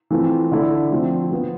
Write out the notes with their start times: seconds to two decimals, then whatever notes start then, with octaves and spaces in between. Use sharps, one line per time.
0.11 E3 A3 C4 F4
0.51 D3 A3 E4 A4 D5
0.91 D3 F3 A3 C4
1.31 F3 B3 F4